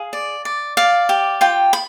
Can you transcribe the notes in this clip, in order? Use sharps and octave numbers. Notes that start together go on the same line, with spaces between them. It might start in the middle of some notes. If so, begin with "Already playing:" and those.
Already playing: G#4 F5
D5
D5
D5 F5
G4
F4 G5
B5